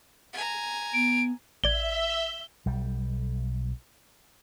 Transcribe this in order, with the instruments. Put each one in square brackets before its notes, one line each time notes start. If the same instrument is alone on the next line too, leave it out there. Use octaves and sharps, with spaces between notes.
[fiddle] G#5 A#5
[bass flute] B3 [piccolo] D7
[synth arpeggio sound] A1 D5 G#6 [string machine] E5 [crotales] G7
[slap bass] B1 G3